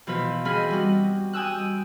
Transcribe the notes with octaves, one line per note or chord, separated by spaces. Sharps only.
B2 E3 F3 B4
E3 C4 G#4 D#5 B5 F6
G3 F#4
G5 G#5 D#6 E6 F#6